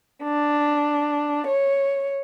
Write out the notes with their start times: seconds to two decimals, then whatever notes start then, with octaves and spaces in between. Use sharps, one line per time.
0.22 D4
1.46 C#5